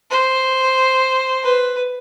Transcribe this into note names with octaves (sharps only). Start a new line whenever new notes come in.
C5
B4